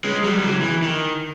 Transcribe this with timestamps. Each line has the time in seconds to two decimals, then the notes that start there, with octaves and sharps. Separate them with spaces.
0.04 G#3 C#4
0.24 F#3 G3
0.44 C#3 F#3
0.61 E3
0.82 D#3